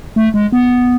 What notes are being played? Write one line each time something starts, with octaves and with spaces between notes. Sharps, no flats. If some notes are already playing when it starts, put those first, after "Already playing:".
A3
G#3
B3